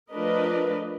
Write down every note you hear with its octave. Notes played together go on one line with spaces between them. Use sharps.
F3 A3 D4 A#4 B4 D#5